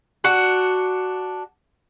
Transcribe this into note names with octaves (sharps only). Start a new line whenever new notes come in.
D4 F#4 F#5